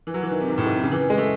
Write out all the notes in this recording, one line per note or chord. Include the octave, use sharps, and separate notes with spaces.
E3
F#3
E3
D#3
C3
G#2
A2
G#2
C3
C#3
E3
G#3
A3